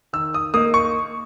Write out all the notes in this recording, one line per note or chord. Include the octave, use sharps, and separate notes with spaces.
D#3 E6
D#6
A#3 D#4 D#6
C#6